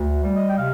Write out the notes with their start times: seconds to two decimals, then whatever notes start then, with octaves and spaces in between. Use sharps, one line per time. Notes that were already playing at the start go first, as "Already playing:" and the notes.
Already playing: D2
0.21 G3
0.34 D#5
0.49 G5
0.58 C3 F5